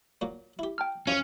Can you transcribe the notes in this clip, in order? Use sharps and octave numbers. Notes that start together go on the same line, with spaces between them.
A#2 F#3 A#3
E4 G4
G5 A5 F6
F#2 F3 C#4 F4